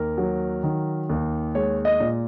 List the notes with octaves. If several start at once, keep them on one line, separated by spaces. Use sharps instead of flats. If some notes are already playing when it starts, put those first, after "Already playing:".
Already playing: D#2 A#4
F#3
D#3
D#2
G#3 C#5
D#5
A#2